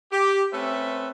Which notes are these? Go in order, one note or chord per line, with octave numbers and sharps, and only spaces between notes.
G4
A3 C4 C#4 B4 E5